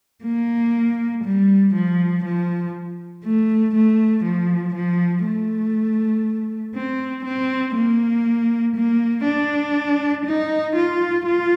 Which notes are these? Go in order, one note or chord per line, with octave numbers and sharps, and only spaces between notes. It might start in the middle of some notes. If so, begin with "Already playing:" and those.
A#3
G3
F3
F3
A3
A3
F3
F3
A3
C4
C4
A#3
A#3
D4
D#4
F4
F4